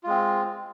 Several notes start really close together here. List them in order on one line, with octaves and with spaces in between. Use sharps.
F4 G#3 C4